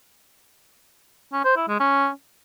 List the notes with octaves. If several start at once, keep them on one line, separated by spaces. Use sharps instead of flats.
C#4
C5
E4
G#3
C#4